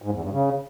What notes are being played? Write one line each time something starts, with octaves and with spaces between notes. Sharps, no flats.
G#2
E2
G2
C#3